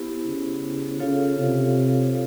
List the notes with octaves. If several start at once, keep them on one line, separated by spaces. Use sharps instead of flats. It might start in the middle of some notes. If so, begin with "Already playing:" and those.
Already playing: B3 E4 G4 C5
C#3
C#3 F4 A4 C#5 F5
C3